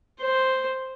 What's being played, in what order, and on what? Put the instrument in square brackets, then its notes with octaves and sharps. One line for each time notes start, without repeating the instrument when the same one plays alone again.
[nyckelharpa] C5